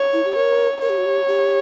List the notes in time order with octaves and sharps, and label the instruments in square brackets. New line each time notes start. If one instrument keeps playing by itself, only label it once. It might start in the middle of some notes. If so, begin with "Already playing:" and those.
Already playing: [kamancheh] C#5
[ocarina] E4
G4
[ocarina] A#4 [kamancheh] C#5
[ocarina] A#4 [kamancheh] C#5
[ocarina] G4
F#4
G4
G4